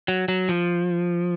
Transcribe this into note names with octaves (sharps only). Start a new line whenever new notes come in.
F#3
F#3
F3